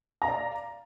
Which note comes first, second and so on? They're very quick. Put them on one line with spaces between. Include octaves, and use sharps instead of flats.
A#5 F5 D5